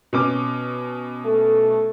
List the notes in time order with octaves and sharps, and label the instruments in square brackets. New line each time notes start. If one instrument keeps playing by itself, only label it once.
[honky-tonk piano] B2 C#4 D6
[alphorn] A3